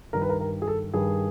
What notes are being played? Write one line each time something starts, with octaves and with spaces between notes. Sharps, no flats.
G2 D#3 G3 A#4
B4
A#4
A#4
G#4
A4
G2 D#3 G3 G#4